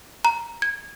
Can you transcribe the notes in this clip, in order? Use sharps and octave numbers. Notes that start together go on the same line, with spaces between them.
A#5
G#6